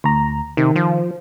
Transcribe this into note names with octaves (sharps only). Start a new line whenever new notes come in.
D2 A#5
C3 D#3
F3